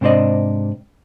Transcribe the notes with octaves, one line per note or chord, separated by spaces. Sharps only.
G#2 C3 D4 C5 D5 D#5